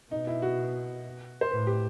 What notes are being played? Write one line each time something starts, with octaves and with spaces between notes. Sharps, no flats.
B2 D#4
E4
F#4
C5
A2 B4
G4